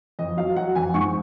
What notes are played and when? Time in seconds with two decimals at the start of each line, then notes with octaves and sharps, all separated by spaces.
0.19 F2 D#5
0.37 F#3 F5
0.56 F#3 F#5
0.75 F2 G#5
0.94 G#2 C#6